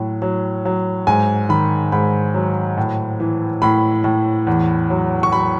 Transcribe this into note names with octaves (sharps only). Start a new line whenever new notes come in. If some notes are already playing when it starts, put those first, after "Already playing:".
Already playing: A2 F#3
F#3
F#3
G#2 G#5
D#3 B5
G#2 B5
F#3
A2
E3
A2 B5
A2
E2
F#3
C#6
F#3 B5